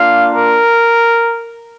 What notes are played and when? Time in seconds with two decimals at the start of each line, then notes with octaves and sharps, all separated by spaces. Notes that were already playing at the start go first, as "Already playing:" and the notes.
Already playing: A#3 D4 F4 F5
0.34 A#4